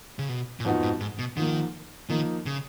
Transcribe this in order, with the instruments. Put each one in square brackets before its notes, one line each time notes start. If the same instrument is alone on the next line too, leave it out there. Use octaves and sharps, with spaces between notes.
[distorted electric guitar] C#3
B2
A#2
[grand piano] F2 F3 B3 D#4 F#4 [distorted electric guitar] G#2
[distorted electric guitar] G#2
G#2
B2
[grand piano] G#2 F3 A#3 [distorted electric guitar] D#3
[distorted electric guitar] D#3 [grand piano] F3 A#3 D#4
[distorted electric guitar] C#3